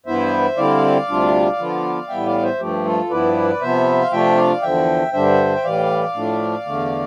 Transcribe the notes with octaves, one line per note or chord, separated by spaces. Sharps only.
G2 E3 B3 E4 C5 E5
D3 G3 C4 E4 D5 F5
D2 C3 G3 D4 F4
D3 F3 B3 F4
A2 E3 G3 B3 E5 G5
D5 F5
C5 E5
G2 F3 A3 G4
F4 A4
G2 F3 B3 E4 B4 D5
D5
C3 F3 B3 C5 E5
F5
C3 F3 A3 D4 F4 E5 G5
D5 F5
E2 D3 F3 E5 G5
G2 D3 G3 D4 C5 E5
G5
A2 E3 G3 D5 F5
A2 F3 A3 D4
E2 D3 A3